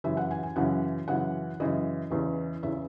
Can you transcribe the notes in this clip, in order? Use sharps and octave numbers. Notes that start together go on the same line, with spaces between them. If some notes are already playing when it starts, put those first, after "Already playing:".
F#2 C#3 E3 E5
F#5
G#5
G#5
F#2 C#3 E3 F#5
F#2 C#3 E3 F#5
F#2 C#3 E3 D#5
E2 C#3 E3
E2 C#3 E3 E5